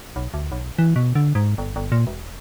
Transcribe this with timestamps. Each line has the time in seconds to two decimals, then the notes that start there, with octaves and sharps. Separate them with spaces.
0.16 B1
0.34 D2
0.52 B1
0.79 E3
0.96 B2
1.15 D3
1.35 G#2
1.58 G1
1.76 G1
1.92 A#2
2.07 E1